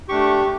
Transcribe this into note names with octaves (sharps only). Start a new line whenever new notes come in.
A3 D4 G4 C#6